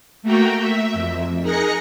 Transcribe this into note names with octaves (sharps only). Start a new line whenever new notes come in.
A3 A#3 F#4 A#4 G5
E5
F2
D#4 G#4 A#4 F#6 A#6 C#7